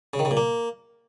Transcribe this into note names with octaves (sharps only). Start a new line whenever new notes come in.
C#3
D#3
C#3
A#2
A#3